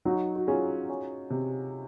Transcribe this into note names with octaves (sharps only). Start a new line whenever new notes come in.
F#3 D#4 F#4
F#4
C#4 F4 G#4
C#4
C3